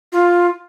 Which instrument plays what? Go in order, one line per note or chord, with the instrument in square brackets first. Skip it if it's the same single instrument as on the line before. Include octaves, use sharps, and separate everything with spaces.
[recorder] F4